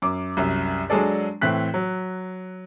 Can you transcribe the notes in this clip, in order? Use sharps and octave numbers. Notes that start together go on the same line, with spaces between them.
F#2 D6
C2 F#2
F#3 G#3 D4 G#4 A4 D5
A2 E3 C4 F#6 B6
F#3